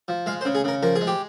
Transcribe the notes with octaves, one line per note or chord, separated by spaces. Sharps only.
F3
G#3 F5
C5
C#3
G#4
C#3 A#4
F3 A#4
G#4
G#3
G4